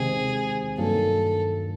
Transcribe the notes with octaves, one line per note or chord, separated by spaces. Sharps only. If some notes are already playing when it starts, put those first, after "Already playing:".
Already playing: C3 D#3 G#3 C4 G#4
G2 D#3 F#3 A#3 A4